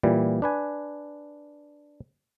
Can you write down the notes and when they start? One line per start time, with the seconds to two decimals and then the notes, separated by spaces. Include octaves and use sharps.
0.03 A#2 E3 G3
0.42 D4 B4 G#5